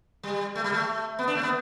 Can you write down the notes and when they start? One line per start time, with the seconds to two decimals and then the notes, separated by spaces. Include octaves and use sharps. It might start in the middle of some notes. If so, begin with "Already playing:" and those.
0.23 G3
0.55 A3
0.64 G3
0.72 A3
1.19 B3
1.27 D4
1.35 A3
1.43 B3